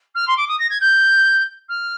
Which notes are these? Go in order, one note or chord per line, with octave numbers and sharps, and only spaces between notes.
F6
C6
D6
D#6
A#6
G#6
G6
F6